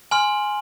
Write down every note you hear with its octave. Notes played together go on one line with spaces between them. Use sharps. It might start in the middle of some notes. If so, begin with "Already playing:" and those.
G#5 C6 F6 F#7